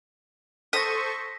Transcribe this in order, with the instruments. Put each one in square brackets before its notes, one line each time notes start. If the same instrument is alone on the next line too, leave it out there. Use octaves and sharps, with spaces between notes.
[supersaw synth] A4 C5 C#6 [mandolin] D#6 [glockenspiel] A#6 B6